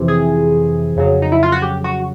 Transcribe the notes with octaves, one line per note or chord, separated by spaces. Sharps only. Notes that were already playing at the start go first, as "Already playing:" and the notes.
Already playing: F2 C3 E3
G#4
F2 C#3 F#3
D#4
E4
F4
F#4
G4
F#4